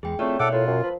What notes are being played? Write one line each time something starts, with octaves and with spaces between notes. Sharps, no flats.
E2 G#3 G#4 G5
A3 C4 E4 F4 C#5 D5
B2 E4 A4 C#5 F#5 D6 F#6
A2 F4 A#4
F#2
F3 B4